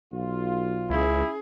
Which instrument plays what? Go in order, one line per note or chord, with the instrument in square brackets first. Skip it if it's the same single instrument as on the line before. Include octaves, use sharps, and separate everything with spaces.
[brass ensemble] B1 F4
[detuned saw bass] C#2 [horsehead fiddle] C#4 G#4 [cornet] E4